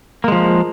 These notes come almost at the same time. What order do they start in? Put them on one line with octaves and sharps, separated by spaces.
A#3 G#3 F3